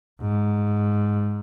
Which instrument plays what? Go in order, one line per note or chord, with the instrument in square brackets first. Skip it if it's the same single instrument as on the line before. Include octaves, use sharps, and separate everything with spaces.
[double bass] G#2